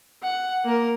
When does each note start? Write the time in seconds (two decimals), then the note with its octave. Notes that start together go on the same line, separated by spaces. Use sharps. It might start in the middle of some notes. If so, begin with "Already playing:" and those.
0.23 F#5
0.64 A#3 A#4